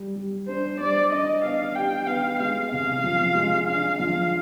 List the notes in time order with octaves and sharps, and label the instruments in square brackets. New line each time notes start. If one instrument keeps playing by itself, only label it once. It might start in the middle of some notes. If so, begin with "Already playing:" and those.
Already playing: [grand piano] G3
G3
[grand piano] D4 [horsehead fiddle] C5
[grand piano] G3 [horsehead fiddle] D5
[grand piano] D4 [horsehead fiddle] D#5
[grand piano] B3 [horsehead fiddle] F5
[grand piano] G4 [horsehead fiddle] G5
[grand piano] B3 [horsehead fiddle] F5
[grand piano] G#3 [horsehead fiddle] F5
[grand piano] C3 [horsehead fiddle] F5
[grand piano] F3
G#3
[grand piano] D4 [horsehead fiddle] F5
[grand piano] F3 [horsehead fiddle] F5